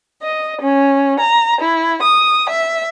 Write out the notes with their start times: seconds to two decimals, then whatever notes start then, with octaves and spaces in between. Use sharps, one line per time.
0.22 D#5
0.60 C#4
1.20 A#5
1.60 E4
2.02 D#6
2.49 E5